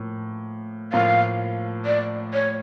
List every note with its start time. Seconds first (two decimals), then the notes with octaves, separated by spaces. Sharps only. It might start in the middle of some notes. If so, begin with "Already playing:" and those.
Already playing: A2 F3 A#3
0.93 A2 F3 A#3 F5
1.86 D5
2.33 C#5